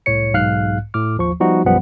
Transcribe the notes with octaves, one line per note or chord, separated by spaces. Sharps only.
C2 A2 C#5 C#7
B1 G#2 F5 F6 F#6
A2 D6 F6
G#1 D#2 F3 C#6
F3 G3 B3 D#4 F#4
B1 F#2 F3 G3 B3 F#5